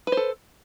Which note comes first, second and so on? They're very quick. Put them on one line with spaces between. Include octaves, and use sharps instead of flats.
B4 C5 A4